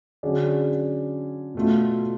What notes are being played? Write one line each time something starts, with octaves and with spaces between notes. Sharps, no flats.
D3 F#3 C#4 G#4 D5
B2 A3 F4